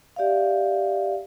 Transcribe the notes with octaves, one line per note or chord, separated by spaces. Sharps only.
G4 D5 E5 F5